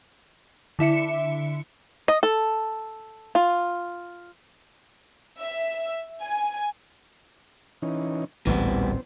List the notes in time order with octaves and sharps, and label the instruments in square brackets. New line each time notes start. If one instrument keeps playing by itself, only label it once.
[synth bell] D3 E4 E5 C#7
[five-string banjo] D#5
A4
F4
[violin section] E5
G#5
[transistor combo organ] E3 C#4 D#4
[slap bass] A1 D2 A#2 [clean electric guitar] E3 G3 B3 [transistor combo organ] C4